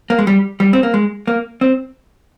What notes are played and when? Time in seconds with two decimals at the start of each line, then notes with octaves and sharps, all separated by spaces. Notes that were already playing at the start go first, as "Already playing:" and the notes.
0.10 A#3
0.19 G#3
0.27 G3
0.60 G3
0.73 C4
0.83 A#3
0.94 G#3
1.27 A#3
1.61 C4